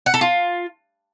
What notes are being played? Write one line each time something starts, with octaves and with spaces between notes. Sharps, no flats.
F#5
A4
F4